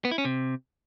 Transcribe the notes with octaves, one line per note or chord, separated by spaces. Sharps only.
B3
E4
C#4
C3